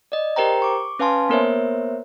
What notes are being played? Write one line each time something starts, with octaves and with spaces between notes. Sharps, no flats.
D5 D#5
G4 A#4 C5 G5 A#5
C#6 D6
C#4 B4 F5 G#5 A5 C6
A#3 B3 A#4 C5 C#5 E5